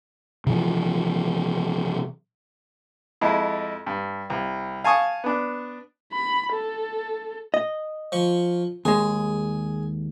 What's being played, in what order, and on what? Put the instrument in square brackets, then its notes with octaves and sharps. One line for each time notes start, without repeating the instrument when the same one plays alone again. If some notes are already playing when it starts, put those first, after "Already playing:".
[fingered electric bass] C3 E3 F3
[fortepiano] F2 G#3 E4
G2
C2
F5 G#5 A5 C#6 D#6
B3 D4
[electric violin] B5
A4
[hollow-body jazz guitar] D#5
[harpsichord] F3 C#6
[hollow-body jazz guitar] D#2 G#3 [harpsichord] G#4